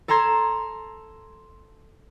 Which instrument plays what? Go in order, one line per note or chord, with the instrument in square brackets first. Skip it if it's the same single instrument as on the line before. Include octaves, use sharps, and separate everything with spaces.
[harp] A4 A5 A#5 C6 G#6